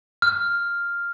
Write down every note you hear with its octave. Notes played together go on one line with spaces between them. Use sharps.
F6